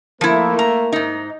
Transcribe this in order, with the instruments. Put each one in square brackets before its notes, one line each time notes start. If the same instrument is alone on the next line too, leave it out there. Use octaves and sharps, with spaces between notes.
[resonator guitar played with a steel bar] F3 E4 [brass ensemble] A3 A#3 A#4
[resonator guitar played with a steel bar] A#5
G#2 D#4